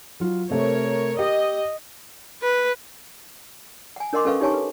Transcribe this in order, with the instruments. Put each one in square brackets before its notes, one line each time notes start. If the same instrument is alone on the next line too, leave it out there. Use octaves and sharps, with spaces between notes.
[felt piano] F#3 F4
[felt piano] C3 A3 [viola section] A#4 C#5
[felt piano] G4 [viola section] D#5
[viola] B4
[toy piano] F#5 G#5
D4 A#4 D#5 F#5 C6 D6
C#4 A4 B4 F5 C#6
D#4 G4 C#5 G#5 A5 C#6
B4